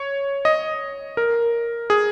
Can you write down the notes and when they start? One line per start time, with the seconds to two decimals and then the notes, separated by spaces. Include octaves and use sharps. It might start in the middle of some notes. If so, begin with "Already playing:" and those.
Already playing: C#5
0.45 D#5
1.17 A#4
1.90 G#4